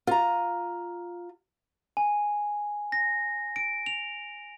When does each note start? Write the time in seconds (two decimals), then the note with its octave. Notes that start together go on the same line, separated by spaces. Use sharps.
0.07 F4 A#5
1.97 G#5
2.92 A#6
3.56 D7
3.86 F7